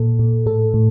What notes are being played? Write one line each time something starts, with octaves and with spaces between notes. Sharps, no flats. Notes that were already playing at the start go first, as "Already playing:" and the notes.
Already playing: A#2 A4
A#2
A2 A4
A2